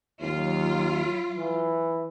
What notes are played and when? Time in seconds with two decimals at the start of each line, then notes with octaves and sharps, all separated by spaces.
0.21 D#2 F#3 F4
1.38 E3